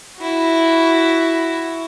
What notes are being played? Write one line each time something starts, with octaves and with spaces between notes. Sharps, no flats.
E4 F#4